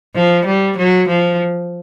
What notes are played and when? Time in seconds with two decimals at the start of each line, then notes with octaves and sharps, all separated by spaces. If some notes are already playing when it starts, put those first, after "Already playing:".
0.15 F3
0.46 G3
0.78 F#3
1.09 F3